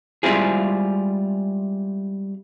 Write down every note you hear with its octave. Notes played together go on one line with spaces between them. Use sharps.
G3 G#3 C4 E4 F4 G#4